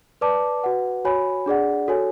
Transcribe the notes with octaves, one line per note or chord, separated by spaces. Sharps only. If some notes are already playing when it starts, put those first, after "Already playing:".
B4 D5 A5 D6
F#4 B4 F#5
F#4 C#5 G#5 B5
D4 G#4 D5 F#5
F#4 A4 C#5 G#5